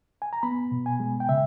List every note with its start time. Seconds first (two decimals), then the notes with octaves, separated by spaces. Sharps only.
0.22 G#5
0.33 A#5
0.43 B3 B5
0.71 B2
0.86 G#5
1.00 G#3
1.20 G5
1.29 C#3 E5